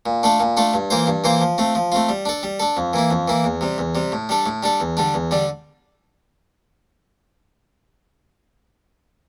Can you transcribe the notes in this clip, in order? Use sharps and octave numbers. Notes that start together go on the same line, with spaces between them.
A#2
A3 D4 F4 A4
A#2
A3 D4 F4 A4
G2
E3 A#3 F4 C5
G2
E3 A#3 F4 C5
F3
A3 C4 F4
F3
A3 C4 F4
G3
D4 A4
G3
D4 A4
F2
E3 A#3 E4
F2
E3 A#3 E4
E2
C3 G3
E2
C3 G3
A2
G3 D4 A4
A2
G3 D4 A4
E2
D3 G3 D4
E2
D3 G3 D4